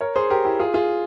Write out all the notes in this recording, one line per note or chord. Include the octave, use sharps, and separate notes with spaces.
A#4 C#5
G#4 C5
G4 A#4
E4 G4
F4 G#4
F4 G#4